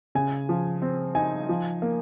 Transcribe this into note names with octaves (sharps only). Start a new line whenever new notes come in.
C#3 G#5
F3
C4
D#4 G#5
F3
A#3